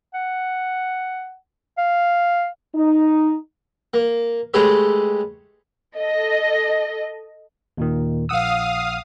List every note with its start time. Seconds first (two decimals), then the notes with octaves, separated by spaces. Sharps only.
0.14 F#5
1.78 F5
2.75 D#4
3.94 A#3
4.54 G#3 A3 G4 G#4 B4 C#5
5.96 A4 D#5
7.77 D#2 A#2 D#3
8.29 A#1 F5 F#5 D#6 E6